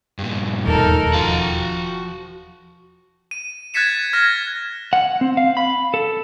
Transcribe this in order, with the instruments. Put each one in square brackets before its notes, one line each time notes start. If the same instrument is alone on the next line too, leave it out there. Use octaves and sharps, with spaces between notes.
[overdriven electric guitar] G2 A#2
[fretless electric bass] E1 D#2 [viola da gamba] D#4 A4 A#4
[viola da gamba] F3 [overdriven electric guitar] F#4 F5
[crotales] D#7
F#6 G#6 A6 B6 C#7 E7
F6 G#6 A#6 E7
[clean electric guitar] F#5
C4
F5
B5
A4